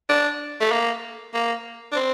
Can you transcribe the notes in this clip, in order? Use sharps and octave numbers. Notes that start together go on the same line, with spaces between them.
D4
A3
A#3
A#3
D4
C4